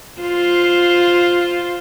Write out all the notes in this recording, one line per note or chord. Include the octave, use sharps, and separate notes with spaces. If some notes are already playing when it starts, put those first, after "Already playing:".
F4 C5